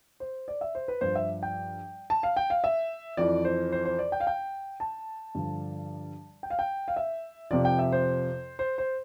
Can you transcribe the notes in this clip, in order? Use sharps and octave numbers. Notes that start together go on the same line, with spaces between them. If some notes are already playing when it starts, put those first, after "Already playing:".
C5
D5
E5
C5
B4
G2 F3 C5
E5
G5
A5
F5
G5
F5
E5
F2 E3 D5
C5
C5
C5
D5
G5
F5
G5
A5
G2 D3 F3
G5
F5
G5
F5
E5
F2 C3 F3 D5
G5
E5
C5
C5
C5